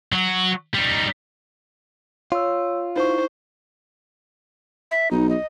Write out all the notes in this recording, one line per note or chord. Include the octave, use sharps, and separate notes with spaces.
F#3 F#4
G3 D#4
F4 C#5 E6
D#4 E4 C5 C#6
E5
B1 D#4
D#5